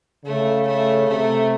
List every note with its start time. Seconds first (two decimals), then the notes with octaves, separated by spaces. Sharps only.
0.25 C#3 A3
0.67 A3
1.08 C3 A3